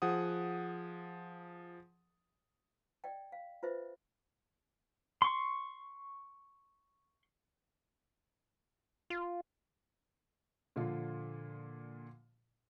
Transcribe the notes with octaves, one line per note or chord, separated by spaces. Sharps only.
F3 G#4 F#5 D#6
D5 D#5 G5
F5
F4 B4 C5 D#5 E5
C6 C#6
F4
A#2 D3 F3 F4